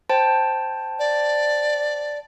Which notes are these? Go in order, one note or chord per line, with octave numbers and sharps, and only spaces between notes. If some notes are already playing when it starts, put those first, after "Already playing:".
C5 G5 A5
D5